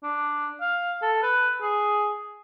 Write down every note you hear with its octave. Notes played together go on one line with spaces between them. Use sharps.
D4
F5
A4
B4
G#4